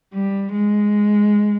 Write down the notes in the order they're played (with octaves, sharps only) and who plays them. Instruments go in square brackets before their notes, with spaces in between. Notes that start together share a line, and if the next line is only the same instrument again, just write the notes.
[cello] G3
G#3